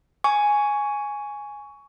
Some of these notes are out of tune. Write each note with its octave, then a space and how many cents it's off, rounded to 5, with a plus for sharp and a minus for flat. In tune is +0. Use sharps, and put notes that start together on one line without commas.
G#5 +0 C#6 +15